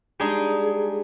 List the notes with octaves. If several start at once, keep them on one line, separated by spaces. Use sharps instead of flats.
G3 G#3 D4 D#4 G#4